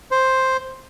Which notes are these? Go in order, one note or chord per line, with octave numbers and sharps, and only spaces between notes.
C5